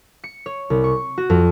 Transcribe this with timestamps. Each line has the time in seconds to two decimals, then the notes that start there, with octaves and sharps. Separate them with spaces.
0.24 C#7
0.46 C#5
0.70 C2
0.84 C#6
1.18 F#4
1.30 F2